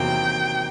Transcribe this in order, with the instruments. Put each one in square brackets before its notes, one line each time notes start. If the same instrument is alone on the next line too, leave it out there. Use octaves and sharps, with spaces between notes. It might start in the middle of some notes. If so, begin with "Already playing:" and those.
Already playing: [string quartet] E2 C3 D#3 F#3 A#3 [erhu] G5